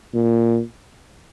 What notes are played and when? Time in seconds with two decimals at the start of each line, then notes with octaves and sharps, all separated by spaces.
0.14 A#2